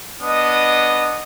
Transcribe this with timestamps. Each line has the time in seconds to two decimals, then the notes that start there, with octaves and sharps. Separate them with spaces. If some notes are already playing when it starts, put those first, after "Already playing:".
0.22 B3 D4 D#5 D#6